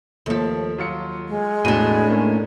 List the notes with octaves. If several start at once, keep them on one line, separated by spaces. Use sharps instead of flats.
D#2 F3 A3 A4
F#3 F4 C#7
G#3
E1 A2 D4 F#4 D#7
A3 A#3 C#4